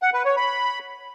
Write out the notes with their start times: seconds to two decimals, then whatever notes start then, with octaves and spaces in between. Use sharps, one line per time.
0.02 F#5
0.14 B4
0.25 C#5
0.37 B5